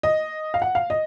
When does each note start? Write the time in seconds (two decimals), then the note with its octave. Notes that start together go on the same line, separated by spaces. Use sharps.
0.03 D#5
0.54 F5
0.62 F#5
0.75 F5
0.90 D#5